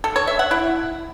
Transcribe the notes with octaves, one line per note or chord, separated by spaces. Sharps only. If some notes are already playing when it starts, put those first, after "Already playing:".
A4
C#5
E5
F#5
E4